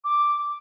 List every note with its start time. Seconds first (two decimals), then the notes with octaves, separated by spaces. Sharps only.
0.04 D6